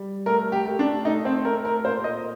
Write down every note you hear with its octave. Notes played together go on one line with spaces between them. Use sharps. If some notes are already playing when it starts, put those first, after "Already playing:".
Already playing: G3
A3 A#4
G4
A3
D4
A3 D#4
C4
A3 A#4
A#4
A#2 C5
D#5